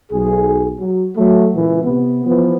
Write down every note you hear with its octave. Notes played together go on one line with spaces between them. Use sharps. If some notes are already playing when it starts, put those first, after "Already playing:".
B1 G#4
F#3
F#3 A3
C#2 A#2 E3
C3 B3
E3 F3 B3